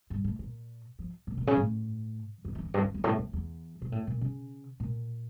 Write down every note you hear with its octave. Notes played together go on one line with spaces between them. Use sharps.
G2
A2
A#2
F3
A#2
A#2
C#3
A2
F2
E3
F2
G2
F2
F2
A2
F2
E2
A#2
A2
A#2
C#3
A#2